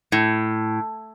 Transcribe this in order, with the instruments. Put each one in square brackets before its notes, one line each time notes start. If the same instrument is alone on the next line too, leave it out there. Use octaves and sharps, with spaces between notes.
[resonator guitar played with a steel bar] A2